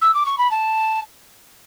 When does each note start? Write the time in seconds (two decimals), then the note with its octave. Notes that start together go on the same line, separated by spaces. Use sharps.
0.01 E6
0.14 D6
0.26 C#6
0.38 B5
0.51 A5